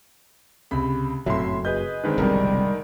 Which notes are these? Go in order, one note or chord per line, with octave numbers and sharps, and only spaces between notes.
C#2 C3 B5
F#1 F2 A2 F#3 E5 C6
G#4 B4 D#5 G6
D3 D#3 G#3 C4 A#4 B4
F1 B1 C3 G3 A#4